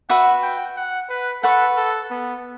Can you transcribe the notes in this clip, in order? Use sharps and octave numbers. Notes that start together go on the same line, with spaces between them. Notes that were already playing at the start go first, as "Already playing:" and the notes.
F#4 B4 E5 F#5
G5
F#5
B4
A4 B4 F#5 C#6
A4
B3